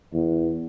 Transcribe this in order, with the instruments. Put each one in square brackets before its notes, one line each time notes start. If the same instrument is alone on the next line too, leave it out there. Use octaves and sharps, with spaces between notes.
[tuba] E2